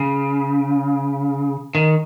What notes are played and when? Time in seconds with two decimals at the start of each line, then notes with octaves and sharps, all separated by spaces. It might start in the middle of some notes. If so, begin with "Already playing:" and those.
Already playing: C#3
1.75 D#3